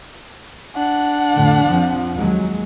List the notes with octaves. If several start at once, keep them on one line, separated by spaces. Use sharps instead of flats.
D4 F#5
F2 A2 D3
F2 F3 C4
D#2 F#3 G#3